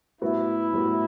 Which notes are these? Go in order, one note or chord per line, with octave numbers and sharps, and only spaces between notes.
A2 G3 B3 E4 F#4
A2 G3 B3 F#4